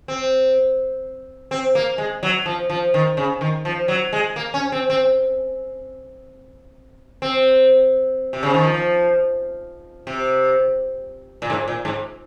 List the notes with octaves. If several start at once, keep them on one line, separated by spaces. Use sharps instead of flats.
C4
C4
A#3
G#3
F#3
F3
F3
D#3
C#3
D#3
F3
F#3
G#3
A#3
C#4
C4
C4
C4
C3
C#3
D#3
F3
C3
A#2
G#2
A#2
G#2